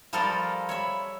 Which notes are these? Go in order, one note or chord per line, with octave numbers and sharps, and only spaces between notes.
F3 G3 F4 A4 A#4 F5
C#5 E5 B5